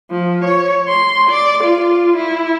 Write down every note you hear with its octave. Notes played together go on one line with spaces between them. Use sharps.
F3
C#5
C6
D5
F4
E4